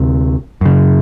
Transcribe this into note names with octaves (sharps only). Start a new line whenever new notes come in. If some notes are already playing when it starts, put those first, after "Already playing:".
Already playing: D2 C3
F#2 C#3